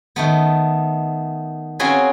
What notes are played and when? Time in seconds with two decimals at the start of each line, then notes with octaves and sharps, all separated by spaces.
0.16 D#3 A3 B3
1.79 C4 C#4 F4 F#4 G#4 B4